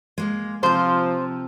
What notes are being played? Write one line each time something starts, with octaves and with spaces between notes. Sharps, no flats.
G#3 A#3
C3 F3 F4 C5